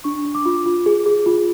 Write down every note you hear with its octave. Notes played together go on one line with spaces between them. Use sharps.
D4 C#6
D4
D6
F4
F4
G#4
G#4
F4